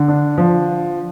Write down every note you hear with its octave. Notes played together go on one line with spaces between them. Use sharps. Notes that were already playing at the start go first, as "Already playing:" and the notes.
Already playing: D3
D4
F3